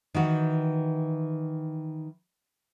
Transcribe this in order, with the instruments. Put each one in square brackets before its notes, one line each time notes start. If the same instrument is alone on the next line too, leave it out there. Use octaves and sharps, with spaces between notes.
[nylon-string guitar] D#3 E3 F#4